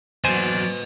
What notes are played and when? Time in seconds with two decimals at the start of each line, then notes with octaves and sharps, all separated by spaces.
0.24 E2 F#3 B4 C5 D5 D#5 G#5